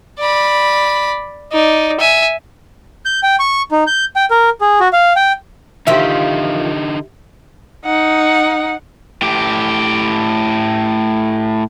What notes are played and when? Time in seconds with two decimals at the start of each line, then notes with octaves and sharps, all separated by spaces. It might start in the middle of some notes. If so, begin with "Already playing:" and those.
0.20 D5 B5
1.52 D#4 D5
2.00 E5 G#5
3.05 G6
3.23 G5
3.39 C#6
3.71 D#4
3.87 G6
4.16 G5
4.31 A#4
4.61 G#4
4.80 F#4
4.93 F5
5.16 G5
5.87 D3 D#3 F3 A#3 D#4 G4 E5
7.85 D#4 F#5
9.22 A2 G4